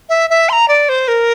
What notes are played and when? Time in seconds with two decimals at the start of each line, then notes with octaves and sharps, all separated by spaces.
0.09 E5
0.30 E5
0.49 C6
0.52 A#5
0.68 D5
0.89 C5
1.08 A#4